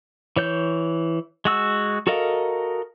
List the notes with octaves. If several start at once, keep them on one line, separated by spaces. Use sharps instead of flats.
E3 C#5 G6
G#3 F#4 E6
F#4 A4 A#4 D#5 F5